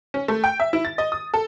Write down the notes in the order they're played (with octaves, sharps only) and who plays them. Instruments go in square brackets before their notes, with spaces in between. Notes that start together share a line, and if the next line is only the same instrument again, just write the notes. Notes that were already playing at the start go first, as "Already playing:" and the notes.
[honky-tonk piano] C#4
A3
G5
E5
E4
A6
D#5
D#6
A4